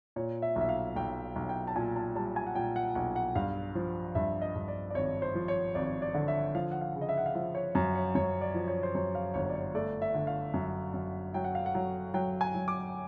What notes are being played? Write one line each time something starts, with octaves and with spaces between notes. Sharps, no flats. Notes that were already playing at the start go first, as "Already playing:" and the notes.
A#2 C#5
E5
B1 E5
F5
B1 G5
B1
G5
A5
A#2 G#5
A5
G3 A5
G#5
F#5
A#2 G5
F#5
B1 F#5
F#5
G2 F5
F3
G2 E5
D#5
G2
D5
D5
G#1 C#5
C5
F3
C#5
G#1 D5
D5
D3
E5
F3 F5
F#5
F5
C#3
D#5
E5
F#5
F5
F3 E5
C#5
F#2 C#5
C#5
F#2 C#5
D5
F3
C#5
C5
F#2 C#5
F5
G1 C#5
D5
C#5
A3 D5
E5
D3
F5
F#2
F#2
F#3 G5
F#5
F5
F#5
F#3
F#3 G5
G#5
F#3
D6